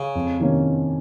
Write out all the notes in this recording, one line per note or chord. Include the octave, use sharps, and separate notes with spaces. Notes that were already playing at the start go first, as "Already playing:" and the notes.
Already playing: C#3
F2
C3 D#3 A#3 C#4